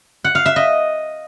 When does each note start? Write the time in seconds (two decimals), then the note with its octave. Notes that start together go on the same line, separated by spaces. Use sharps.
0.24 F#5
0.35 F5
0.46 E5
0.56 D#5